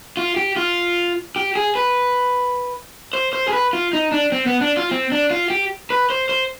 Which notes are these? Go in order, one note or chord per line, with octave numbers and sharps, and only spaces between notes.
F4
G4
F4
G4
G#4
B4
C5
C5
G#4
B4
F4
D#4
D4
C4
B3
D4
F4
C4
D4
F4
G4
B4
C5
C5